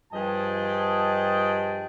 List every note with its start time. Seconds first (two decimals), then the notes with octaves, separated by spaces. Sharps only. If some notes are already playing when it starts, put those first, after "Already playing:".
0.13 G2 F3 G#4 D#5 G5 A5